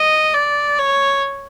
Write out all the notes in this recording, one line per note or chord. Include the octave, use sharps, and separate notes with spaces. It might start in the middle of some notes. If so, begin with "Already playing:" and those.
Already playing: D#5
D5
C#5